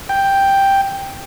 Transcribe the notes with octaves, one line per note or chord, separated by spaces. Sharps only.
G5